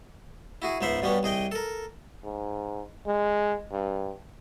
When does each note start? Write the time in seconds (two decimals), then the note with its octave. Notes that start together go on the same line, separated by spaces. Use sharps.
0.62 E4 F#4 G#4
0.81 C#2 G#2 B3 C5 E5 F#5
1.02 G2 B2 G3 B3 C#4 D4
1.23 C2 G#4 D#5 G5
1.52 A4 A#4
2.24 G#2
3.07 G#3
3.72 G2